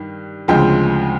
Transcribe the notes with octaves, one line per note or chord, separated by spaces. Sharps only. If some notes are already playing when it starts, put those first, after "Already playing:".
Already playing: G2 D#3
D2 C#3 F3 G#3 C4 G5